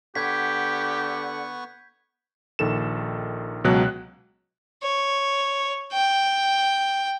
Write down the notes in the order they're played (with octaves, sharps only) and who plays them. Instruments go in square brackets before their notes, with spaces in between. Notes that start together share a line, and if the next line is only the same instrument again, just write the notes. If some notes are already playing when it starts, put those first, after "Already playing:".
[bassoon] D3 [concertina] B3 F#5 C#6 [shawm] G4 [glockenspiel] G6 G#6 B6
[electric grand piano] A#1 D#3 A4 E7
C#2 B2 F#3 F#6
[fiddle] C#5
G5